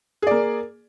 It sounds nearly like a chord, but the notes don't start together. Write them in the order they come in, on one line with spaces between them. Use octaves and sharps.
G#4 D5 A#3